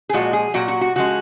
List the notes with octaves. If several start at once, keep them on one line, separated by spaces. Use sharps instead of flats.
G#4
A#2 F3 G#3 F#4
G#4
A#2 F#3 F#4
F#4
F#4
C#3 F3 G#3 F#4